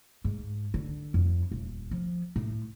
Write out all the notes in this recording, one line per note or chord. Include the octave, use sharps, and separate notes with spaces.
G#2
D3
F2
D#1
F3
A2